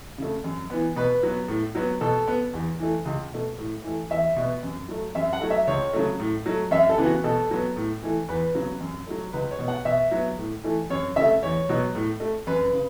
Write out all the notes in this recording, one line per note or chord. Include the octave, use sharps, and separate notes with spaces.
C#3 A3
F#2
E3 B3
B2 B4
F#3 B3
A2
F#3 B3
B2 A4
B3
E2
E3 A3
C#2
B2 A3
A2
E3 A3
E2 E5
B2 B3
F#2
F#3 A3
F#2 E5
F#5
F#3 A3
E5
C#2 C#5
C#3 F#3 A3
A2
F#3 A3
F#2 E5
A4
C#3 E3 B3
F#4
B2 A4
F#3 B3
A2
E3 A3
E2 B4
C#3 F#3 B3
F#2
F#3 A3
C#2 B4
C#5
B2 B3
F#5
B2 E5
F#3 B3
A2
E3 A3
F#2 C#5
C#3 A3 E5
E2 C#5
B2 F#3 B3
A2
A3
F#2 B4
C#3